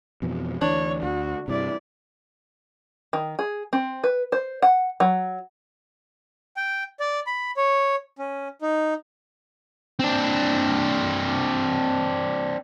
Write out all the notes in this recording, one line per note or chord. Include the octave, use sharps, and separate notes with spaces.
F2 B2 E3
D2 E3 D4 C#5
D2 F#4
G2 C3 E4 D5
D#3
G#4
C4
B4
C5
F#5
F#3
G5
D5
B5
C#5
C#4
D#4
C4 D4